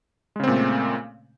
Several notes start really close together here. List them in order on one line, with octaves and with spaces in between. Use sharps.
G#3 C#3 C4 A#2 A3